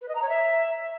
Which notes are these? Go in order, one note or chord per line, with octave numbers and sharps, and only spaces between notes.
B4
D#5
A#5
C#5
E5